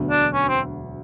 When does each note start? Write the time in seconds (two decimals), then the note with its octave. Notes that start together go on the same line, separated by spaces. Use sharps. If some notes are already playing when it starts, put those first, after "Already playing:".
Already playing: E1 D2 D3 F#3 B3
0.11 D4
0.34 C#4
0.49 C4